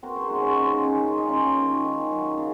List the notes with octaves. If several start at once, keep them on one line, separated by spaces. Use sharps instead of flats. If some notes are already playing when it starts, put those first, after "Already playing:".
C4 F#4 A#4
G#4 C5
G#3 D#4 F#4
C#4 F4
G#3 D#4
C#4
D#3 C#4
D#3 F4
D#4
D#3 C#4 F4
D#3
D#3
F#3
C#3